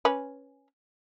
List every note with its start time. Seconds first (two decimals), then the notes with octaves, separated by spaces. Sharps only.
0.05 C#4 B4